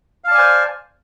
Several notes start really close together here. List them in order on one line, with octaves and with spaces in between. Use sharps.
F5 A5 D5 G#5 C5